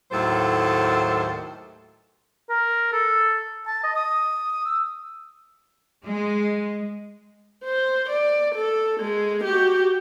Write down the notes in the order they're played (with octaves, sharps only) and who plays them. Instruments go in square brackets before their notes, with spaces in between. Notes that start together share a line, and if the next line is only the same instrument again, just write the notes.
[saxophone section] D#2 A2 F#3 A4 C5
[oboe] A#4
A4
A5
D#5
D#6
E6
[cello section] G#3
[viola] C5
D5
A4
G#3
F#4 G4